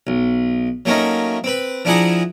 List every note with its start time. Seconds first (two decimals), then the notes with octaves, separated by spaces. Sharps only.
0.07 B1
0.85 F#3 A3 A#3 C#4 D#4
1.44 C4 B4
1.85 F3 D4 E4 G#4 F#5 A#5